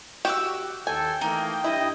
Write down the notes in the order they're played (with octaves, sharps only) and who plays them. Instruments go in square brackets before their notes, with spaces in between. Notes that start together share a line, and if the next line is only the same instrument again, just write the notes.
[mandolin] F#4 D6 E6 [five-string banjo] G4
[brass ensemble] D#2 A4 [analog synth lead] G5 [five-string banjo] G#5
[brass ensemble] E3 A3 A#3 [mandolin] D#4
[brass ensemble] G2 D#5 [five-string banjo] E4